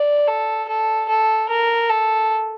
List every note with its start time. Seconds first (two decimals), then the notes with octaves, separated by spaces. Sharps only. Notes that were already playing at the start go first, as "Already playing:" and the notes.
Already playing: D5
0.28 A4
0.69 A4
1.09 A4
1.49 A#4
1.90 A4